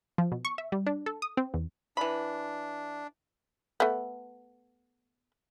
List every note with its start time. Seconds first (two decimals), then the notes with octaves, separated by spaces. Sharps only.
0.18 F3
0.32 B2
0.45 C#6
0.58 E5
0.72 G3
0.87 D4
1.06 A4
1.22 D#6
1.37 C4
1.54 E2
1.97 E3 D4 B5
3.80 A3 B3